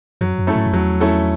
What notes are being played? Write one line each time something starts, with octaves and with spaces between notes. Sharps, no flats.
F#2 F#3
F#2
A3 C#4 E4 A4
G#2
F#2
E2 F#3
A3 C#4 E4 A4